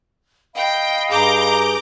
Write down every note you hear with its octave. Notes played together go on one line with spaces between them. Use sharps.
D#5 F5 G5 B5
G2 G#4 A#5 D6 G6